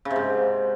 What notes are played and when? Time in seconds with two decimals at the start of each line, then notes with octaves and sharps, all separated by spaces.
0.05 C#3
0.11 C3
0.16 G#2